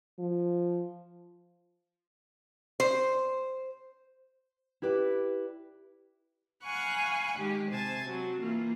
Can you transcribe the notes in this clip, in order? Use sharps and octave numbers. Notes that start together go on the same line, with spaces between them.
F3
C5
E4 G4 B4 D5
F5 F#5 G#5 B5 C#6 F#6
D#3 G#3 G4
C3 C5 G#5 A5 A6
F#3 C4
E3 A#3 F4